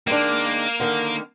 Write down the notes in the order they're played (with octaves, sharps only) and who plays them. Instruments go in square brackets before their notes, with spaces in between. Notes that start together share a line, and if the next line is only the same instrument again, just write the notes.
[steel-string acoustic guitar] D#3 G#3 D4 [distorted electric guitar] A#3
[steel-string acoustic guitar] D3 D#3